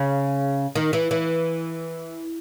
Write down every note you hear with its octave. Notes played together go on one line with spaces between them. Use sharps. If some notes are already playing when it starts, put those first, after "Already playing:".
Already playing: C#3
D#3
E3
E3